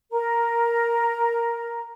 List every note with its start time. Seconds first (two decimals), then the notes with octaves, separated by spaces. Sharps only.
0.12 A#4 A#5